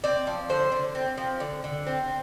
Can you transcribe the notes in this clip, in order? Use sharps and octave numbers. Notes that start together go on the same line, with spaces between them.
C4 D5
F3
D3 C5
D3
C4
F3
D3
D3
C4